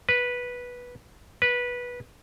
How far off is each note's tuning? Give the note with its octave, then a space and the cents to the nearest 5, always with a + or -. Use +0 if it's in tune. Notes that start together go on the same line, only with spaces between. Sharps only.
B4 -10
B4 -15